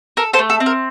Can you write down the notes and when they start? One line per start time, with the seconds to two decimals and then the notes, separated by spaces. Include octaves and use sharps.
0.17 A4 A#4
0.33 A4 C5
0.39 A3
0.50 A4
0.60 C4
0.66 A#4